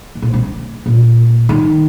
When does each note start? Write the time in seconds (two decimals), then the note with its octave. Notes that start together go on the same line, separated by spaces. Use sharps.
0.15 G#2
0.22 A#2
0.33 C4
0.86 A#2
1.49 D#3